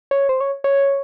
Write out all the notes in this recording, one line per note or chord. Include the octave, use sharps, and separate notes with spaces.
C#5
C5
C#5
C#5